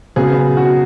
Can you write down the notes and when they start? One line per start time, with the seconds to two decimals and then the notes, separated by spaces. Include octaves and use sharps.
0.16 C#3 F#3 B3 G#4
0.57 F#4